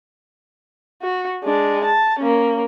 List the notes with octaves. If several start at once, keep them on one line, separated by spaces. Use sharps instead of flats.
F#4
G#3 D4
A5
A#3 C#4